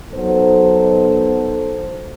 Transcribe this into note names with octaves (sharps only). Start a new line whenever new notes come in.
B2 F#3 B3 D#4 A4 C5